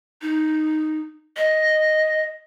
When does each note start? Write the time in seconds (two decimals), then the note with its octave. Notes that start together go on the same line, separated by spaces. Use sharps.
0.22 D#4
1.37 D#5